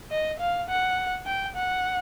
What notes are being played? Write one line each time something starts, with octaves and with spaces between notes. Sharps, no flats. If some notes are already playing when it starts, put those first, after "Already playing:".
D#5
F5
F#5
G5
F#5